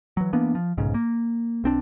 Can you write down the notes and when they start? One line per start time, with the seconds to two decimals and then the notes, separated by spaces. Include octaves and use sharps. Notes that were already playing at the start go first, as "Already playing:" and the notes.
0.17 E3 F#3
0.33 E3 A#3 B3 D4
0.55 F3
0.77 F1 B1 G#2 C#3
0.94 A#3
1.64 B1 C4 D4